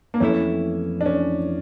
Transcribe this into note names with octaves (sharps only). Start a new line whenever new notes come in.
A#3
F2 E3 A3 C#4 E4
D4
C#4